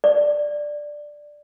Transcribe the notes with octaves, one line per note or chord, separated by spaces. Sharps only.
D5